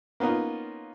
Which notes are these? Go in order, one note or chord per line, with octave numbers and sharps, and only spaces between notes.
A#3 B3 C#4 D#4 F4